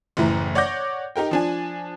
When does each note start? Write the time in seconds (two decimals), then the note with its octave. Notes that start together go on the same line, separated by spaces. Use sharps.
0.17 F#1 A2 E3 A#5
0.55 C#5 D5 F#5 D6 G6 A#6
1.16 D#4 G4 A#4 G5
1.31 F3 D4 G#5